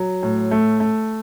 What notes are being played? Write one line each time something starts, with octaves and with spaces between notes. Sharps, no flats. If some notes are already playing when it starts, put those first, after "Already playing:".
Already playing: F#3
A2
A3
A3